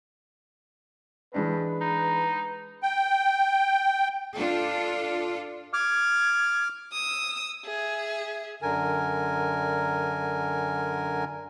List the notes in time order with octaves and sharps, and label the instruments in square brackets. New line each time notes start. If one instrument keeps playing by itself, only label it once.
[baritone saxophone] G2 [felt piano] E3 G#3 D4 [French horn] B4
[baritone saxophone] D#4
[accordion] G5
[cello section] D4 F4 A4
[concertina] D6 F6 [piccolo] G#6
[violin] D#6 E6
G#4 E5
[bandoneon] F#2 D3 A#4 G#5